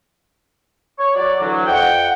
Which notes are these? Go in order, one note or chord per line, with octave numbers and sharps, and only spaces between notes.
C#5
F#3 D5
D2 E3 F#3
F2 F#5 G5